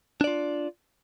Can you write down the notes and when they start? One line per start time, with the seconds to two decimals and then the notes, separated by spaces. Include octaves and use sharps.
0.21 D4
0.24 D5
0.27 F4